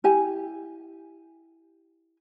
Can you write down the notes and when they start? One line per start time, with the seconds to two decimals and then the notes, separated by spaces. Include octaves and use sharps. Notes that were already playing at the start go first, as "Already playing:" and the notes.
0.04 E4 G4 G#5